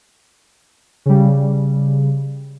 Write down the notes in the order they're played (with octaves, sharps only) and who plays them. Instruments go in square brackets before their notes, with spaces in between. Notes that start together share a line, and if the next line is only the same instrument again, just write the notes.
[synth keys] C#3 G3